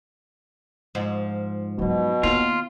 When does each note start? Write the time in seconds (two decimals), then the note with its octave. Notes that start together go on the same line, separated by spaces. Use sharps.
0.95 G#2 F3
1.79 B2 F#3 C#4
2.23 D#2 B3 F4